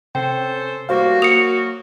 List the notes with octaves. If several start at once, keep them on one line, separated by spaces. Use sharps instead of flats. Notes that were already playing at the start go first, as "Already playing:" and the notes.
C3 C#4 A4 C5 G5
A2 G3 A#3 F#4 C5 F5
F#3 A#3 D#6 C#7 F7